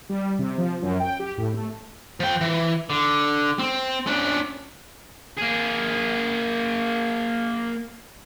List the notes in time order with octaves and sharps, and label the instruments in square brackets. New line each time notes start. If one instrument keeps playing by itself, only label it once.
[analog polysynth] G3
C3
F3
F#2
G5
G4
A2
A3
[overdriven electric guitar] F3 G5
E3
D3
C4
C#4 D4
[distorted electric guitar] A#3 G#4